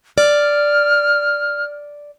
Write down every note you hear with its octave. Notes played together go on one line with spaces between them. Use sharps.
D5 F6